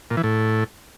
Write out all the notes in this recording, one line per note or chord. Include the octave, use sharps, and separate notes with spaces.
A#2
E3
A2